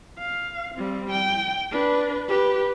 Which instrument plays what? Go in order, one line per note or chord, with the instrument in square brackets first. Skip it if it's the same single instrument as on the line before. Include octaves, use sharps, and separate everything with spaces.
[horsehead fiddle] F5
G3 C4
G5
D4 B4
G4 B4